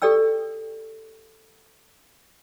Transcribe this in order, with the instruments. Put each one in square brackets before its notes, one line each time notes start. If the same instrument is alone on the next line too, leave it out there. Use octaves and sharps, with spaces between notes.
[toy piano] G4 A4 D5 G5 E6